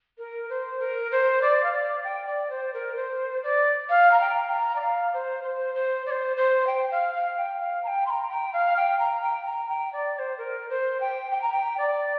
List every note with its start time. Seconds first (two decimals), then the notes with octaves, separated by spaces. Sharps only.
0.18 A#4
0.49 C5
0.79 A#4
1.11 C5
1.41 D5
1.63 F5
1.72 D5
2.04 G5
2.27 D5
2.50 C5
2.74 A#4
2.96 C5
3.43 D5
3.89 F5
4.11 A#5
4.20 G5
4.51 A#5
4.76 D5
4.81 F5
5.13 C5
5.44 C5
5.75 C5
6.06 D5
6.11 C5
6.37 C5
6.67 G5
6.91 F5
7.14 F5
7.37 G5
7.60 F5
7.83 A#5
7.87 G5
8.06 C6
8.10 A#5
8.29 G5
8.53 F5
8.76 G5
8.99 A#5
9.22 G5
9.45 A#5
9.69 G5
9.93 D5
10.15 D5
10.19 C5
10.38 A#4
10.70 C5
11.00 G5
11.31 G5
11.41 A#5
11.52 G5
11.78 D5